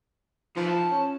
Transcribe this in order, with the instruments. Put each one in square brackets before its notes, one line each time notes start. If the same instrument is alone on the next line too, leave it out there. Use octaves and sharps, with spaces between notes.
[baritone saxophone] F3 [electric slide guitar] D#4 B4
[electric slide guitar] A5
[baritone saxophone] C#4